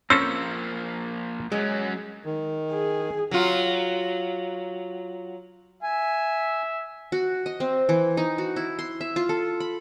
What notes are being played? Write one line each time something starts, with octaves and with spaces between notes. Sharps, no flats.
F3 A#3 C4 C#4 A4 E6
F#3 G#3 C#4
D#3
G#4
F#3 F4
E5 G#5
F#4
D#5
C4
E3
D#4
F#4
E4
C6
E5
F4
A4
B5